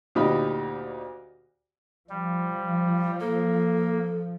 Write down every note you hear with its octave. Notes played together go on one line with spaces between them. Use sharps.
D2 A#2 D#4 G4 B5
F3 G3
A#3 A4